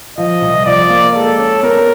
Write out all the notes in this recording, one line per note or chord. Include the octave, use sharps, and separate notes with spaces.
F3 D#5
C2
F3 D5
A#3
G#3 A4
C#4
B3 A#4